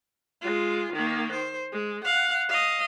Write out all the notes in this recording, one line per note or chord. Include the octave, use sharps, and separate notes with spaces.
G#3 F4
D#3 A#3
C5
G#3
F5 F#5
D#5 F5